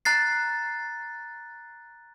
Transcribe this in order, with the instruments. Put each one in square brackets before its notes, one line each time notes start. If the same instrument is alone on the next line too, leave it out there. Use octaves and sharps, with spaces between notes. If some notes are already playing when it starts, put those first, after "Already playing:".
[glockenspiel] A#5 F#6 A6 C7